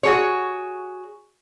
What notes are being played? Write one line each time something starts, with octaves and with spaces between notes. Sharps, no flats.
F#4 G#4 C#5